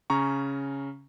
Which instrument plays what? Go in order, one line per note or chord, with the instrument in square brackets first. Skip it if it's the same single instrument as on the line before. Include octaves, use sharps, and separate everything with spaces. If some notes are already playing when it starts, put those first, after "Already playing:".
[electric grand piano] C#3 C#4 A#5 C#6